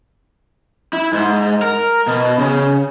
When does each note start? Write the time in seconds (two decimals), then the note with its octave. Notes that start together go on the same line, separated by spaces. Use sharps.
0.93 E4
1.13 G#2
1.62 A#4
2.07 B2
2.39 C#3